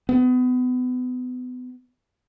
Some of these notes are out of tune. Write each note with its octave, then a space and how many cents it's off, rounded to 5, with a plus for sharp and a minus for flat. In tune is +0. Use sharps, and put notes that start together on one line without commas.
B3 +30